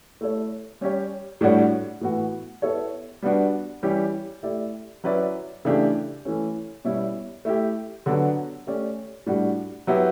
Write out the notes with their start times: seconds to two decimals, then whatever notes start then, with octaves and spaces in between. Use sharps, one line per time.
0.21 A3 E4 A4 C#5
0.81 G3 C#4 G4 C#5
1.41 A2 G3 D4 F#4 C#5
2.01 A2 E3 B3 F#4
2.62 B3 E4 A4 C#5
3.22 G3 B3 D4 F#4
3.83 E3 G3 C#4 G4
4.43 A3 E4 G4 D5
5.04 F#3 C#4 E4 B4 D5
5.65 C#3 E3 A3 D4 G4
6.25 E3 A3 C#4
6.85 B2 G3 C#4 E4
7.45 A3 E4 G4
8.06 D3 F#3 B3 D4 F#4
8.67 A3 C#4 G4 D5
9.26 A2 G3 D4 F#4
9.87 F#3 B3 E4 G4